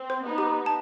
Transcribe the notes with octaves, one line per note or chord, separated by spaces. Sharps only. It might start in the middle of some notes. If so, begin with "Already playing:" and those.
Already playing: C4
C5
B3 D#4
G4
A5